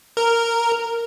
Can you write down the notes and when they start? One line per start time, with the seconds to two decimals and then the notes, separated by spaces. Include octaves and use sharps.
0.17 A#4